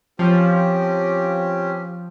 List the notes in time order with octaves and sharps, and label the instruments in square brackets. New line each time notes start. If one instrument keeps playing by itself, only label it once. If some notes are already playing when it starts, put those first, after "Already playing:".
[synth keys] F3 [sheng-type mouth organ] C4 C#4 G4